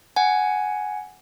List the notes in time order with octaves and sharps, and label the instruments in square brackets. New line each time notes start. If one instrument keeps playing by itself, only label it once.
[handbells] F#5 G#5